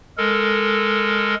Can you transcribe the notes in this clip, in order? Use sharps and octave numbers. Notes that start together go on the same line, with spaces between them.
G#3 A4 A#4